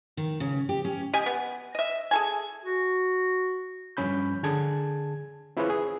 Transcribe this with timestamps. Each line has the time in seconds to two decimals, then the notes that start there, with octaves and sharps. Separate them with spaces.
0.17 D#3
0.40 C#3
0.69 G4
0.85 C#4
1.13 G4 D#5 G#5
1.26 B3
1.75 D#5 E5
2.11 G#4 A4 G#5
2.64 F#4
3.97 G2 F3 C#4 B5 G6
4.43 D3 G#4 A5 G#6
5.57 C4 E4 F4 G#4 B4 C#5
5.70 G#4